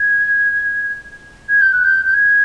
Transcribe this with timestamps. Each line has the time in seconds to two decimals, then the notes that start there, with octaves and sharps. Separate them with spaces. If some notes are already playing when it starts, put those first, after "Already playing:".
Already playing: G#6
1.48 G#6
1.61 G6
1.72 F#6
1.84 G6
2.05 G6
2.13 G#6